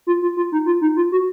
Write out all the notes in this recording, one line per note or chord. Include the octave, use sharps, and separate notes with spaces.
F4
F4
F4
D#4
F4
D#4
F4
F#4